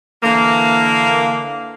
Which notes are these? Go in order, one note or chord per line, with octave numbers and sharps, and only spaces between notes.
D3 E3 A#3